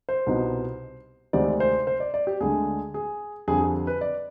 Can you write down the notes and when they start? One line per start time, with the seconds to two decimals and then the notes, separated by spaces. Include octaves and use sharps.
0.09 C5
0.26 C2 B2 B3 D#4
1.33 D2 C3 D#3 G#3 C4 D5
1.60 C5
1.87 C5
2.00 D5
2.14 D5
2.27 G4
2.40 D2 D3 G#3 G#4
2.94 G#4
3.48 F2 D3 G3 G#4
3.61 G#4
3.87 B4
4.01 D5